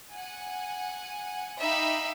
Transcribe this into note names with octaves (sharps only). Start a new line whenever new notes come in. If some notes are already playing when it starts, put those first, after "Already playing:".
F#5 G#5
D#4 E5 F5 G5 B5 D6